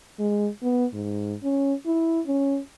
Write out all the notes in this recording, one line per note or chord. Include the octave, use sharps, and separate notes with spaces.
G#3
B3
G#2
C#4
E4
C#4